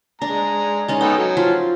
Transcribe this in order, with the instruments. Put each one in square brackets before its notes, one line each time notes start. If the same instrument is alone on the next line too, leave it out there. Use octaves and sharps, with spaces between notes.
[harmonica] G#3 A#5 [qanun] D4
[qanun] G#3 C#4 D#4
[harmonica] B3 D#4 A4 [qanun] G5
[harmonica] F#3
[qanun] F3 F4